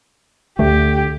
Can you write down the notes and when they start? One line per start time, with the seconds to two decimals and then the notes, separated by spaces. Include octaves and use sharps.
0.59 D2 D3 A3 G4